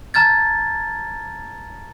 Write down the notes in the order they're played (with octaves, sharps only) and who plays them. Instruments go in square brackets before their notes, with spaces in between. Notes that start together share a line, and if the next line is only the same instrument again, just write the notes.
[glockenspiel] A5 A#5 F6 G#6 A6